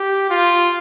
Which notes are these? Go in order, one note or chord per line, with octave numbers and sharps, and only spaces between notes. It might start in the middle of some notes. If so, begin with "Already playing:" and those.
Already playing: G4
F4